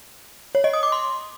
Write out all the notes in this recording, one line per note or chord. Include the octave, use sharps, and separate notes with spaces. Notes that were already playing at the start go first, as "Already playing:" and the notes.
C#5
D#5
D#6
D6
C6